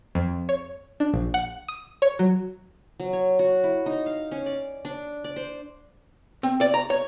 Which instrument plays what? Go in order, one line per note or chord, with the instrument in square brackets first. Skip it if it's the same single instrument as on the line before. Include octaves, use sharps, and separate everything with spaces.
[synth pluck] F2
C#5
D4
A#1
F#5
D#6
C#5
F#3
[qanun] F#3
C#5
F#4
E4
D#4
F5
C#4
D5
D4
D5
C5
[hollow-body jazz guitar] C4
D5
A#5
C#5